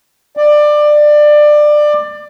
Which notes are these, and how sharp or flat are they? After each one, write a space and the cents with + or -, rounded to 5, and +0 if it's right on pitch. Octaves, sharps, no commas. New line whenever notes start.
D5 +20